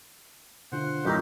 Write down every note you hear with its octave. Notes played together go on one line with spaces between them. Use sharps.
B2 D3 F4 C5 F#5
F#2 A2 D#4 G4 A#5